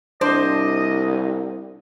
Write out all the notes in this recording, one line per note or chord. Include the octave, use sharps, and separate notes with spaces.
C2 D4 C5 D#5